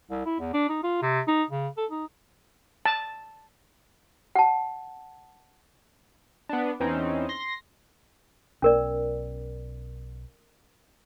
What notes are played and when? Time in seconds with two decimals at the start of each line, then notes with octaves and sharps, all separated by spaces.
0.10 C2
0.25 E4
0.40 E2
0.54 D4
0.69 D#4
0.84 F4
1.02 C3
1.28 D#4
1.50 C#3
1.77 A4
1.91 D#4
2.85 A5
4.35 F#5 A5
6.49 B3 D4
6.80 E2 E3 C4 C#4 D#4
7.29 C6 A#6
8.62 B1 C#4 A#4 D5